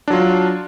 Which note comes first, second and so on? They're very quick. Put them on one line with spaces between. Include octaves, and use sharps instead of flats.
D4 F#3 F4